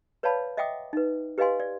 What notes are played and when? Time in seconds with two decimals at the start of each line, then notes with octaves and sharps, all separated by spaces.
0.23 B4 C#5 D5 F5 A5 B5
0.57 D#5 E5 F#5 G5 D6 D#6
0.93 D#4 B4
1.38 G4 B4 D#5 F5 G#5 C6
1.60 D5